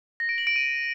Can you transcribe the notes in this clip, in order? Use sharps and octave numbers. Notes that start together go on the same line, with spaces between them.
A#6
D7
F#7
D7
D#7